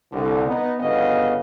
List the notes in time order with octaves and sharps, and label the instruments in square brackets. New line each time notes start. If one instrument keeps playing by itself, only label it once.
[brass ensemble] C2 D3
B3 D#4
G1 C#3 B3 D#5 F5